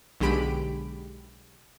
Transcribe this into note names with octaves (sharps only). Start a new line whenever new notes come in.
B1 D3 G#3 G4 B5 D7